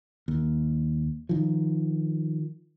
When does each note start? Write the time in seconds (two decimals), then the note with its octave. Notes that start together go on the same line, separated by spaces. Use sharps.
0.28 D#2
1.29 D#3 F3